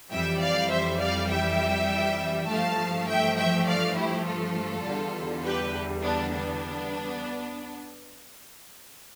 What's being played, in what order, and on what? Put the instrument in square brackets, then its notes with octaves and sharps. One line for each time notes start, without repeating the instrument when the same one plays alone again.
[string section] F2 E3 G3 E5 G5
D5 F5
C5 E5
D5 F5
E5 G5
G2 F3 A3 F5 A5
E5 G5
E5 G5
D5 F5
E4 G4
F4 A4
E2 D3 G3
G4 B4
B3 D4
B3 D4